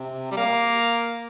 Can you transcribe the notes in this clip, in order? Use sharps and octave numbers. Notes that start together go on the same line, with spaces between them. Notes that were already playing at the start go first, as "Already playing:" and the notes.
Already playing: C3
G3
A#3